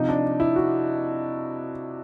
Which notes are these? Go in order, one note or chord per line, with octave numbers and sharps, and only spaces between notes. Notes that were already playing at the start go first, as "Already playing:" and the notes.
Already playing: C3 F3 D#4
D4
E4
F#4